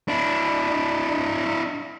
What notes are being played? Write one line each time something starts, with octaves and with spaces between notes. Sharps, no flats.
D4 E4